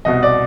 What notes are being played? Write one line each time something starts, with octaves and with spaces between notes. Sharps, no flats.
C2 B2 D#5
D5